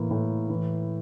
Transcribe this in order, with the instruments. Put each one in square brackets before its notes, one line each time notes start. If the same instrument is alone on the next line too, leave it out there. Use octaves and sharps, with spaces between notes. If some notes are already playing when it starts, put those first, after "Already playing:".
Already playing: [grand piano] A2 E3 A#3
A2
E3